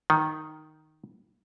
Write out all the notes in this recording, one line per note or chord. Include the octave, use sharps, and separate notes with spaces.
D#3